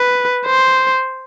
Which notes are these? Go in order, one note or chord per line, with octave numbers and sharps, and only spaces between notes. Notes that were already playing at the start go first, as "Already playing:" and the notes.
Already playing: B4
C5